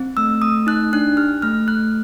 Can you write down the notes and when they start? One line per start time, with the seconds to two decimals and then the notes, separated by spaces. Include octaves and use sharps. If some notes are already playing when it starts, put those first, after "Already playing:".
Already playing: C4
0.17 A3 E6
0.42 A3 D#6
0.67 D#4 F#6
0.93 D4 F#6
1.17 G4 F6
1.42 A3 F6
1.68 A3 F#6